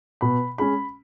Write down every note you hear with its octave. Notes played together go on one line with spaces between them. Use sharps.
B2 B5
G#3 C#4 B5